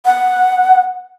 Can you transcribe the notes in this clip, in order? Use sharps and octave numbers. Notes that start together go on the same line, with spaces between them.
F#5